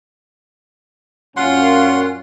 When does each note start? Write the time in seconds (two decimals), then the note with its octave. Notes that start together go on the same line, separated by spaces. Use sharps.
1.37 F#2 A#2 C#4 F4 F#5 C6